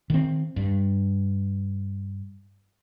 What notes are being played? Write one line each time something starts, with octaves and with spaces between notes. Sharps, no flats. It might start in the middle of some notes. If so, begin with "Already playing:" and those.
D#3 C4
G2